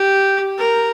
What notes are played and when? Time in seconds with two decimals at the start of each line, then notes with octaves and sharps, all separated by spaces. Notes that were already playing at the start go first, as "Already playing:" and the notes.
Already playing: G4
0.58 A#4